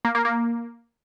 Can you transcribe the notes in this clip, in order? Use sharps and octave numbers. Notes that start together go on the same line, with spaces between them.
A#3
A#3
A#3